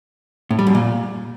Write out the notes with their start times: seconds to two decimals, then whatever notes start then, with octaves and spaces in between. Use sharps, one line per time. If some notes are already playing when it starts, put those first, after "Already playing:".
0.51 A2
0.59 G3
0.67 F#2
0.75 A#2